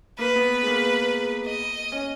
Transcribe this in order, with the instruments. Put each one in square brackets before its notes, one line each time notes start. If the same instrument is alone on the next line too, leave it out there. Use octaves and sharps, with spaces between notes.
[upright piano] A#3 [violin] B4
[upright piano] B3
G#3
A#3
[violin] D#5
[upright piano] C#4